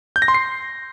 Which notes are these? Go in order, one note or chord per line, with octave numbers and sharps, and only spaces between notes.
G6
A#6
C6
C7